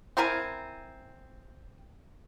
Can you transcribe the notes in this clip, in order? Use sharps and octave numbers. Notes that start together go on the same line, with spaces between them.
C4 E4 A#4 G#5